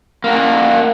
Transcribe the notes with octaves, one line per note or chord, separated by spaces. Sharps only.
A#3 F#4